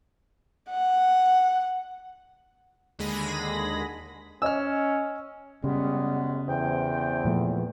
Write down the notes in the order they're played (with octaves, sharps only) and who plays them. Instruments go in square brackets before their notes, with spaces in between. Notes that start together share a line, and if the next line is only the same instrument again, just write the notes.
[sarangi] F#5
[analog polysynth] D#2 D3 G#3 G#4 B5 A#6
[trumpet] C#4 [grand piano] C#5 D#5 G#5 [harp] E6 F6
[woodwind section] F#2 G#3 B3 [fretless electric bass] C#3 [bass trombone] G3
[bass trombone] E2 [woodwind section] C3 C5 G5
[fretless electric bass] A#2 F3 A3